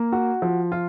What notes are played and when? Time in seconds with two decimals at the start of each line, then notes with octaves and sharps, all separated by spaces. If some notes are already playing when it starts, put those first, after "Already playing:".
Already playing: A#3
0.12 F#4
0.42 F3
0.72 F4